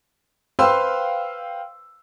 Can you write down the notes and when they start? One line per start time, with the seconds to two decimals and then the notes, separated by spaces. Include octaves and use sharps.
0.59 B4 C5 F5 G5 C6 E6